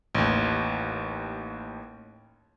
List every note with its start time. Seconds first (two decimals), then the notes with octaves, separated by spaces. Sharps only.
0.15 A1 D#2